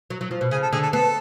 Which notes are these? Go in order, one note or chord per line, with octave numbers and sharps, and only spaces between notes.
F#3
F#3
F3
B2
C#3 G#4
A4
D3 G#4
A4
B3 A4